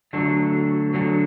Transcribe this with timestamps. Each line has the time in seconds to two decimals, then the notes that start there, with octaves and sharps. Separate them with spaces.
0.13 D3 F#3 A3 D4 F#4
0.94 D3 F#3 A3 D4 F#4